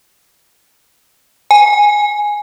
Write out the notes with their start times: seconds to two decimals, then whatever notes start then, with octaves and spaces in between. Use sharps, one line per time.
1.51 G#5